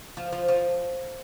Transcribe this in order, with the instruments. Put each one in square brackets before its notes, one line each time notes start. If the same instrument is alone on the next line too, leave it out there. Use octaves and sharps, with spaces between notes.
[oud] F3
F3
F3